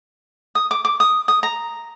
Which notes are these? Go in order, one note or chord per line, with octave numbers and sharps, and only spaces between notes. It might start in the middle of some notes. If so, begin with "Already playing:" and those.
D#6
D6
D6
D#6
D#6
A#5